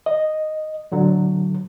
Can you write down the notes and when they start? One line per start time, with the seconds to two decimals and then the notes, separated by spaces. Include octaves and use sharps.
0.06 D#5
0.92 A2 D3 F#3